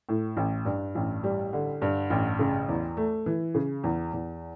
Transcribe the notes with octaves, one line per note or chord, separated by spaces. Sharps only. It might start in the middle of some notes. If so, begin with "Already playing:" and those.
A2
A1
G2
A1
G3
D3
G2
A1
C#3
E2
A3
E3
C#3
E2
E2